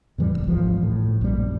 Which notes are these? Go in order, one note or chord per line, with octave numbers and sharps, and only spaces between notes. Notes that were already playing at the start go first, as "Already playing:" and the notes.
F2 A2 E3 G3
D#1 G#1
G#1 D2 E3 F3
A2
A#1 F#2 G3